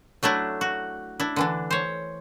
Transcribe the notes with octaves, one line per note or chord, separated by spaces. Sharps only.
F#3 A3 D4 E4
F#4
D4 E4
D3 E3 D4
C5 C#5